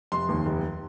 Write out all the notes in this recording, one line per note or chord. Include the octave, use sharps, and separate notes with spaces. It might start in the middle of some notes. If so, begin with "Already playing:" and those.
F1 C6
D#2
F1